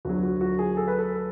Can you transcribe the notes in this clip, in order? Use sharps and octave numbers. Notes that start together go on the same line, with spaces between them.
D2 D3 F#3 F#4
F#4
F#4
G#4
A4
B4
A4